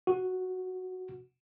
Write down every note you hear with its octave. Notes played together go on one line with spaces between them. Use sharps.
F#4